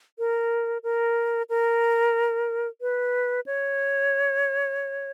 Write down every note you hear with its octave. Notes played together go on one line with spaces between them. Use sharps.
A#4
A#4
A#4
B4
C#5